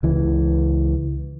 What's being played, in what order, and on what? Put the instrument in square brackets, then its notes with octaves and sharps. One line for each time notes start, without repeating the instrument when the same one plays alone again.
[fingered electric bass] C#2 E3